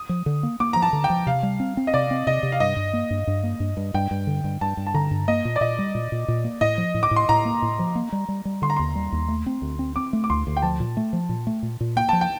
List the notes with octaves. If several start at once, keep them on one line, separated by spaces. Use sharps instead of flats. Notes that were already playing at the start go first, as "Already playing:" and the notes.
Already playing: D#6
F3
D3
A#3
A#3 D6
F3 A#5
A5
D3
G5
F3
C3 F5
G3
C4
C4
D#5
C3 D5
C4
C3 D#5
C3
F5
G2 D#5
G2
A#3
G2
G2
A#3
G2
G2
G2 G5
G2
D3
G2
G2 A5
G2
A5
D3 A#5
G2
A#3 D#5
A#2
D5
A#2 D#5
G3
A#2
A#2
A#2
A#3
A2 D#5
F3
A2
D6
A2
C6
A2 A#5
A#3
A2
F3
A#3
G3
G3
G3
D3 C6
A#5
D#2 C6
G3
D#2
A3
C4
D2
C4
C4 D6
A3
D6
D2 C6
D2
G5
F3 A5
A#2
A3
F3
A#2
A3
A#2
A#2
A#3 G5
F3 A5
G5